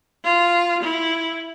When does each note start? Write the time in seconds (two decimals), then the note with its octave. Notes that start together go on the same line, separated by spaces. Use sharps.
0.24 F4
0.82 E4